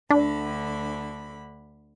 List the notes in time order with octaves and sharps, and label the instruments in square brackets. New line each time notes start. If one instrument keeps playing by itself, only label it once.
[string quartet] D2 D3 B5 [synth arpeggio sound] D4